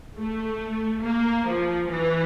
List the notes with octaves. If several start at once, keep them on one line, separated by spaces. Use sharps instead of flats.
A3
A#3
F3
E3